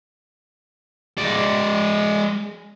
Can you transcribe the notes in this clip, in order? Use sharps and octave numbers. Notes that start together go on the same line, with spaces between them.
G#3 D5